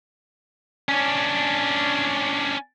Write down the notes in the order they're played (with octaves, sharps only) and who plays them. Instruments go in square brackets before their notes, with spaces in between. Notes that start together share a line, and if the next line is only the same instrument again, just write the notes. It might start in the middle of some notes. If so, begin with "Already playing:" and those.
[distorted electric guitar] C#4 D4